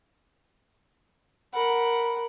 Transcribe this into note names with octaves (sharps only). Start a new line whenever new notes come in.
A#4 F#5 B5